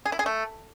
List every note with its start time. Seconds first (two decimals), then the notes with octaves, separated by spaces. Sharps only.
0.06 G#4
0.12 E4
0.19 G#4
0.26 A3